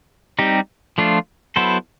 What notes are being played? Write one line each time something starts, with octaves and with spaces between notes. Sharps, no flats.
G3 C4 D#4 G4
F3 A3 D4 F4
F#3 B3 E4 A4 C5